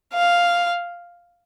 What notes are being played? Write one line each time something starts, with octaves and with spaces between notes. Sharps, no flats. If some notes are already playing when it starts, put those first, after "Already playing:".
F5